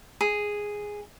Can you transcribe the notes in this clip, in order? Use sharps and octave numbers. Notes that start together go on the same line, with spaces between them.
G#4